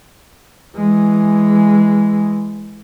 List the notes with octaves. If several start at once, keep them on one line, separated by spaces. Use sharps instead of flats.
E3 G#3